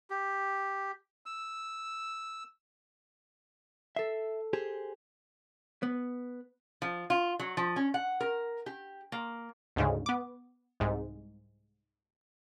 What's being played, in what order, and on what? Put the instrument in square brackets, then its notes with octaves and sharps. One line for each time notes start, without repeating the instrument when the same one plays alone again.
[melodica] G4
E6
[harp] A4 C7 [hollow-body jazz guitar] E5
[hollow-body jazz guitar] G4 G#4 C5
B3
[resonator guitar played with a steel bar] F3
F4
F#3
F3
C#4
F#5
A#4
G4
A#3
[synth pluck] D2 G#2 C#3
B3 D6
C2 G#2